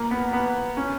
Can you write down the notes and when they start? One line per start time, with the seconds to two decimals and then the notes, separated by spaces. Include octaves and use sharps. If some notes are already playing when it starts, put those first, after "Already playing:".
Already playing: A#3
0.11 B3
0.33 B3
0.77 C#4